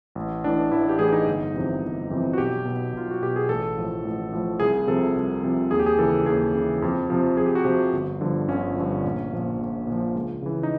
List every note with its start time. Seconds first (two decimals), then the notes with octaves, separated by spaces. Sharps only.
0.15 A1
0.44 A2 E3 D4
0.71 A1 E4
0.89 G4
0.99 A2 E3 G#4
1.13 D#4
1.27 G1
1.54 F2 C3 E3
1.82 G1
2.10 F2 C3 E3
2.33 F#4
2.38 B1 G4
2.65 B2
2.94 B1 F4
3.11 F#4
3.22 B2 G4
3.36 G#4
3.49 A1 A4
3.77 A2 F3
4.05 A1
4.32 A2 F3
4.60 C2 G#4
4.87 C3 F3 A4
5.15 C2
5.43 C3 F3
5.71 D#2 G#4
5.79 G4
5.86 G#4
5.98 C#3 E3 A4
6.26 D#2 G#4
6.55 C#3 E3
6.82 F2
7.10 C3 F3
7.37 F2 G#4
7.46 G4
7.55 F#4
7.64 C3 F3 G4
7.93 G1
8.21 G2 D3 F3
8.48 G1 C#4
8.77 G2 D3 F3
9.04 A#1
9.32 A#2 F3
9.59 A#1
9.87 A#2 F3
10.15 C#2
10.42 C#3 E3
10.63 D#4